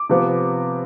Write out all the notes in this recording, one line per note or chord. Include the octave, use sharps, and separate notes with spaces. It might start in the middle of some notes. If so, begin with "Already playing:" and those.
Already playing: D6
C3 F3 B3 F4